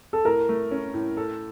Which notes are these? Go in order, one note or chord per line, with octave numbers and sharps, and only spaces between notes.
A4
A2 A#4
A3
C#4
A2
A4